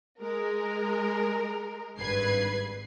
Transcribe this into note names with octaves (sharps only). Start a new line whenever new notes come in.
G#3 A#4
G#1 G2 B4 G#6 C7